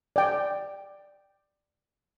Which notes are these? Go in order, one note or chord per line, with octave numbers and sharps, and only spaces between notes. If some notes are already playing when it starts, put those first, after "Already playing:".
D5 G5